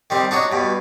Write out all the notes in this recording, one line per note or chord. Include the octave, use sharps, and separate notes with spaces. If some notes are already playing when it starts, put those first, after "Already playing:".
D#3 G3 C4
D4 D#4 F#4 C#5
G2 B2